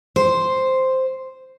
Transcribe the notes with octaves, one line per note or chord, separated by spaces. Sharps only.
C5